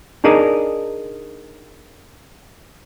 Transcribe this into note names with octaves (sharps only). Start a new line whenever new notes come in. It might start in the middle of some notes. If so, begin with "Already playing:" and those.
D4 D#4 G#4 A#4 D5 D#5